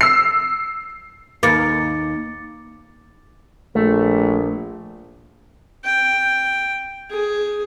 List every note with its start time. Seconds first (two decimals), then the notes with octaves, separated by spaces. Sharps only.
0.01 E6 C7
1.43 D#2 A#3 D6 A6 C#7
3.75 A#1 A3
5.84 G5
7.11 G#4